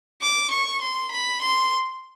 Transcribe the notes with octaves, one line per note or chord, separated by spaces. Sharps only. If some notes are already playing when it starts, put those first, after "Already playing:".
D6
C#6
C6
B5
C6